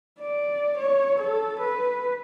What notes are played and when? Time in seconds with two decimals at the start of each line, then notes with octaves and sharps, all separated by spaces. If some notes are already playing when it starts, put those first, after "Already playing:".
0.19 D5
0.78 C#5
1.19 A4
1.60 B4